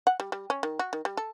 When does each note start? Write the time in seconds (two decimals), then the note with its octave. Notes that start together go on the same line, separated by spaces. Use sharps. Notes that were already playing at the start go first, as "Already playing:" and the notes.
0.07 F#5
0.20 G3
0.32 G3
0.50 C#4
0.63 D#3
0.79 F#4
0.93 D#3
1.05 G3
1.17 A4